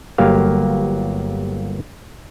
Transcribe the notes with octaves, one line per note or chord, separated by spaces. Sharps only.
G1 F#3 A#3 G4 F5